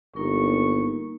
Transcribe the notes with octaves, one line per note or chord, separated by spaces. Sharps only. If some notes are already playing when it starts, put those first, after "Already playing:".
G1 A#3 D#4 A#4 C#6